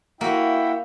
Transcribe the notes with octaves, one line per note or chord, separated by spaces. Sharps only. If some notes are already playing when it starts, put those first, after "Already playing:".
A#3 E4 F#4 E5 G5